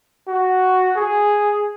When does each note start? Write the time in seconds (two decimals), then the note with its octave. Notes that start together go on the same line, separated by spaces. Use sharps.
0.28 F#4
0.96 G#4